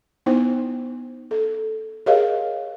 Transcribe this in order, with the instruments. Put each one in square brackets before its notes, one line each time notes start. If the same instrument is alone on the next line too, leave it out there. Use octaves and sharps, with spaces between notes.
[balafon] B3 D#4 E4 C5 G5
A4
G4 G#4 A#4 C#5 D#5 F5